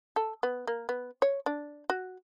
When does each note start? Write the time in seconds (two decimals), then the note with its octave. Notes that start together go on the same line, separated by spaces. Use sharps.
0.16 A4
0.43 B3
0.67 A#3
0.89 B3
1.22 C#5
1.46 D4
1.90 F#4